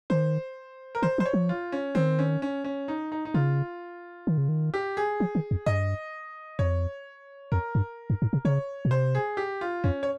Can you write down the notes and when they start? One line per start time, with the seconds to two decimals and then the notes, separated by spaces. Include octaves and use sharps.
0.10 D#3 C5
0.95 A#4
1.02 D#3 C5
1.18 F3 C5
1.26 C#5
1.34 F3
1.49 F4
1.72 C#4
1.95 D#3 C4
2.19 C#4
2.42 C#4
2.64 C#4
2.88 D#4
3.12 D#4
3.25 D#4
3.34 C#3 F4
4.27 D#3
4.38 C#3
4.49 D#3
4.74 G4
4.97 G#4
5.20 F3
5.35 D#3
5.51 F2
5.66 G2 D#5
6.59 F2 C#5
7.52 F2 A#4
7.75 G2
8.10 G2
8.22 G#2
8.33 C3
8.45 C#3 C#5
8.85 A#2
8.91 C3 C5
9.15 G#4
9.37 G4
9.61 F4
9.84 F2 C#4
10.03 C#5